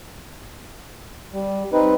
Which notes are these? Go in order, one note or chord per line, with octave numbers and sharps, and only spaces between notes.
G3
C4 D#4 B4